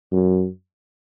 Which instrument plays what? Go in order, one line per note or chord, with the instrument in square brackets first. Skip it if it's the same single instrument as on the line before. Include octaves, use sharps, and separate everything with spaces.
[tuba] F#2